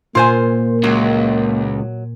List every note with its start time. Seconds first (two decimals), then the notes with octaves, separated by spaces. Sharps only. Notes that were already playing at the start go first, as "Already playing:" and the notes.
0.15 A#2 A#3 F4 C5 G#5
0.83 C#2 F#3